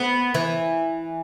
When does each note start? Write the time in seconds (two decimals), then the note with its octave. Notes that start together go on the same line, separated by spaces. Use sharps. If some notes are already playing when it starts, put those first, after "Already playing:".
Already playing: B3
0.34 E3